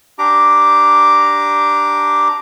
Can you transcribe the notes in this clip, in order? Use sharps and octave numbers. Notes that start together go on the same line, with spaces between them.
D4 G4 A#5 D6